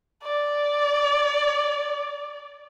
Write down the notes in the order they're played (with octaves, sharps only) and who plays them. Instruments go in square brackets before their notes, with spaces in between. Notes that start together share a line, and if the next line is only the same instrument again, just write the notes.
[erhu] D5